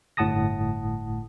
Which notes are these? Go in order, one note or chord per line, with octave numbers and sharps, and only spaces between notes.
G1 A2 F#5 A5 D#6 A#6